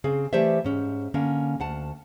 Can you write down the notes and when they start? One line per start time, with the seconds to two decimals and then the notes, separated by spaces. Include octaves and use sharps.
0.04 C#3 C4 G#4
0.33 E3 A3 G4 C5 D5 E5
0.64 G#2 C#4
1.14 D3 A#3 C#4
1.60 D2 F#5 A5